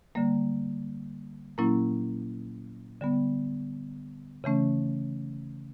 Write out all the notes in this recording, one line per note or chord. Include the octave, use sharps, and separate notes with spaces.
D3 G3 A#3
A#2 F#3 A#3 C#4 E4
D3 G3 B3
C#3 E3 A3 C#4